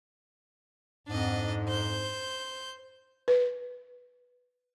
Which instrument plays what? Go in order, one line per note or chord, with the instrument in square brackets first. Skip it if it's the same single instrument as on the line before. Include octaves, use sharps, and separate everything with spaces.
[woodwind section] F2 G#2 [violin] D4 D#5
[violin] C5 G6
[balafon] B4